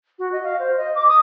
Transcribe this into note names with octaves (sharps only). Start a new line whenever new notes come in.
F#4
D#5
F5
C5
D#5
D6
D#6